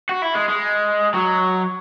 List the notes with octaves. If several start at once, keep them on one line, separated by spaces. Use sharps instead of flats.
F#4
E4
G#3
G#3
F#3